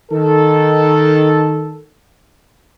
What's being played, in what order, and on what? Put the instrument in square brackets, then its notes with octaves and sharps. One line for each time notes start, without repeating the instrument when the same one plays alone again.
[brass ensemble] D#3 A4